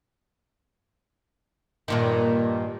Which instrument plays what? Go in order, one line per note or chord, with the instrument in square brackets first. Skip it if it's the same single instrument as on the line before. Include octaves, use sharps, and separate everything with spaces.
[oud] G2 A#2 D#3